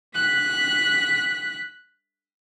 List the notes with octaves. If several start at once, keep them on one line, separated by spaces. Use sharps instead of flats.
F#6 B6